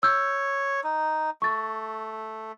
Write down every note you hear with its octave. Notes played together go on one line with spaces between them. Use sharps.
C#5 E6 G6
D#4
A3 C#6 A6